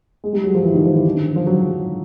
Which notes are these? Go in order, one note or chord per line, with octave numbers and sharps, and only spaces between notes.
G#3
G3
F#3
F3
E3
D#3
F3
E3
D#3
D3
F3
F#3